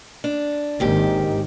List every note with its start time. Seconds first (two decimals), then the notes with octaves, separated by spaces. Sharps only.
0.24 D4
0.80 G#1 D#2 G#2 D#3 G4